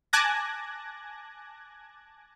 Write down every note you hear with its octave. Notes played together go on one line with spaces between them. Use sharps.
G#5 A5 D6 F#6 G#6 A#6